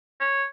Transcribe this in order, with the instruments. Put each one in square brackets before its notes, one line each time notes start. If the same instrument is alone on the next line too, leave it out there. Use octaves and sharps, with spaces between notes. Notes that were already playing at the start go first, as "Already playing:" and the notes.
[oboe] C#5